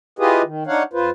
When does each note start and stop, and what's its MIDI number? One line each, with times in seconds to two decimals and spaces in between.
0.19 0.42 64
0.19 0.42 65
0.19 0.42 67
0.19 0.42 68
0.19 0.42 71
0.19 0.42 75
0.44 0.64 51
0.67 0.83 62
0.67 0.83 63
0.67 0.83 73
0.67 0.83 77
0.67 0.83 78
0.93 1.10 41
0.93 1.10 65
0.93 1.10 71
0.93 1.10 72